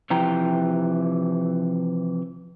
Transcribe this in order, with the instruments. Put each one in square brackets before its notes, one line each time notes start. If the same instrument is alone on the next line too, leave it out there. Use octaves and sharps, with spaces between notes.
[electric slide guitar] C3 E3 F3 E4 G5 A#5